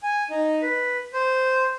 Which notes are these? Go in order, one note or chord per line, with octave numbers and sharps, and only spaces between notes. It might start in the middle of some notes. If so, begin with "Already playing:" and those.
G#5
D#4
B4
C5